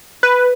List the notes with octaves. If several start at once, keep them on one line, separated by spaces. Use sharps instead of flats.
B4